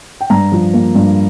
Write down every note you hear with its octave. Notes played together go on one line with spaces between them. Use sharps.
G5
G2 A#5
F3
A#3
G2